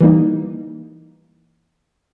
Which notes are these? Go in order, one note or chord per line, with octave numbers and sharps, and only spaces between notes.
E3 G3 A#3 D#4